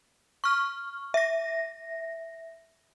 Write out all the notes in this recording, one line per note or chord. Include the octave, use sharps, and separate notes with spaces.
C#6 F6
E5 A#6